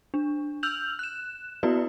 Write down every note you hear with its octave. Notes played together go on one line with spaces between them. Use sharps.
D4
E6 F6 G6 F7 F#7
F#6 E7
A#3 B3 E4 F#4 B4 D5